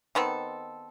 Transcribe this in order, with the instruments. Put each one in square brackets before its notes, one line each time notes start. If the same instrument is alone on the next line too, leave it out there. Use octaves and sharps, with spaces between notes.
[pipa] D#3 B3 C4 A4